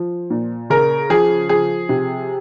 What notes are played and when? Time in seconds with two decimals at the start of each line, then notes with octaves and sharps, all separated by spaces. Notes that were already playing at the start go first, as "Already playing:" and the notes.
Already playing: F3
0.30 A#2
0.70 C#3 A#4
1.10 F3 G#4
1.49 F3 G#4
1.89 C3